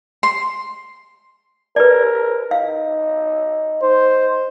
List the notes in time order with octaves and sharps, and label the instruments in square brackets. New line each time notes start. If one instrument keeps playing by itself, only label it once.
[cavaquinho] C6
[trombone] A#4 [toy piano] B4 D5
[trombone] D#4 [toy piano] F5
[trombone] D#4 [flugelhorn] C5